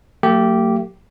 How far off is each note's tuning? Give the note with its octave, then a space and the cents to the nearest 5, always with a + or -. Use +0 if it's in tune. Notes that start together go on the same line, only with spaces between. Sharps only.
F#3 -20 A3 +45 G4 -10